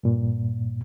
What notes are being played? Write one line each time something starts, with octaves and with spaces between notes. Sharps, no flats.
G2 A#2